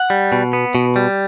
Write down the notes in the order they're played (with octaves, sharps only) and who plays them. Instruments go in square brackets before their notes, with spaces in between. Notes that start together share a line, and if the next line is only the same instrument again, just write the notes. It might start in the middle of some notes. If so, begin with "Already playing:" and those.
Already playing: [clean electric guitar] F#5
G3
B2
B3
B2
G3